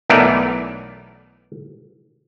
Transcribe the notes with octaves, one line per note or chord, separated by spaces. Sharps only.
B1 E3 A3 B3 A#4 D5